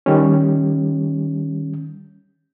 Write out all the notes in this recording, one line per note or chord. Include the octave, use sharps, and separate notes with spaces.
D#3 G3 C#4